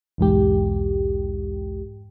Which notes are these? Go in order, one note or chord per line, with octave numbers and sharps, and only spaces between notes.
B1 E2 G#2 G4